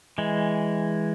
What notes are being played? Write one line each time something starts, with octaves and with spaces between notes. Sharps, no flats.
E3 G#3